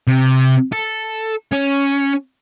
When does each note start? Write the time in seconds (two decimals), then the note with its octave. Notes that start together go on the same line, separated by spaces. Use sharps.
0.07 C3
0.72 A4
1.53 C#4